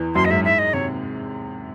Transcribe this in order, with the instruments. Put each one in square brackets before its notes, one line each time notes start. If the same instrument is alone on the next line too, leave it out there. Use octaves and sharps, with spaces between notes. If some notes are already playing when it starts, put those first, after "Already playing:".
Already playing: [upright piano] E2 E3
[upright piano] F#2 F#3 [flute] C6
[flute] D#5
[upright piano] G#2 G#3 [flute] E5
[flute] E5
D#5
[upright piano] C3 [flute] C#5